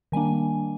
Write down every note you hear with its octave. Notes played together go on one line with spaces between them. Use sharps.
D#3 G3 A#3 D4 G#5